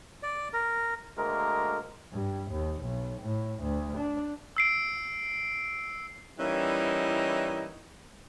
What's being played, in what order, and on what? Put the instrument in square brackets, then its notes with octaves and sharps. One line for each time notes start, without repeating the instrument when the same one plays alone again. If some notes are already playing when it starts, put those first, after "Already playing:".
[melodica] D5
A#4
[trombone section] D2 G#3 A#3 A#4
[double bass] G2
D#2
B1
A2
D2
D4
[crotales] E6 C7 D7
[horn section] E3 G3 A#3 C#4 D#4 E4